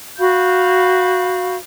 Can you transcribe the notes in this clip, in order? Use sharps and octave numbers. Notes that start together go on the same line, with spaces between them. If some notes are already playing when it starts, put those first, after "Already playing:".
F#4 F5 B5 G6